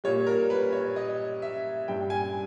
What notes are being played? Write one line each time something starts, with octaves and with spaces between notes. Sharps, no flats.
A#2 G3 C#5
A#4
B4
C#5
D#5
E5
G2 G3 G5
G#5